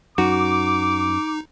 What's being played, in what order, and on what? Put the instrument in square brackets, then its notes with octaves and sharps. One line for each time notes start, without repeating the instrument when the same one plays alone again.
[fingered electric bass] F#2 [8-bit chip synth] D#4 [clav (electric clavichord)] F#4 [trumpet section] D6